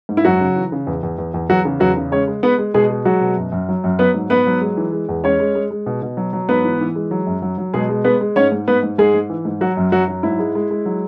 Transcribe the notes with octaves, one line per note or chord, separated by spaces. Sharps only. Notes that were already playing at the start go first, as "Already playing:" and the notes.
G#2
E4
F#2 F#3 F#4
C#3
E3
C#3
E2
E2
E2
E2
E2 F#3 F#4
C#3
E2 F#3 F#4
C#3
G#3 C#4 C#5
G#3
G#3 B3 B4
G#3
B2 G#3 G#4
G#3
F#3 G#3 F#4
B2
F#2
F#2
F#3
F#2
F#3 B3 B4
G#2
G#2 B3 B4
F#3
G#3
E3
G#3
E2
G#3 C#4 C#5
G#3
G#3
G#3
B2
B2
F#3
F#3
G#2 B3 B4
E3
E3
G#3
F#3
F#2
F#3
F#3
B2 G#3 G#4
G#3
G#3 B3 B4
G#3
G#2 C#4 C#5
G#2
G#2 B3 B4
G#2
G#2 G#3 G#4
G#2
E3
G#2
F#3 F#4
F#2
F#2 F#3 F#4
F#3
G#2 E4
G#3
G#3
G#3
F#3